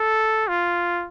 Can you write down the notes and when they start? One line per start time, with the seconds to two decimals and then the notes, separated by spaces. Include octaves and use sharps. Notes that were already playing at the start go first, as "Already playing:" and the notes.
Already playing: A4
0.48 F4